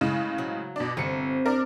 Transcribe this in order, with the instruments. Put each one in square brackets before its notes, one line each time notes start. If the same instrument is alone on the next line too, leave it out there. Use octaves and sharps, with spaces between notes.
[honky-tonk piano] A2 C#3 G#3
[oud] F#3
[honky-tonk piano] B2 D4
[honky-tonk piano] G1 C#7 [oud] C3
[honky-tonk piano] D4 A#4